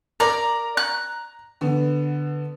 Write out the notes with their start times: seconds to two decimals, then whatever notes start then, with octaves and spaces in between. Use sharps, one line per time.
0.20 A#4 D5 A#5
0.77 F#6
1.61 D3 B3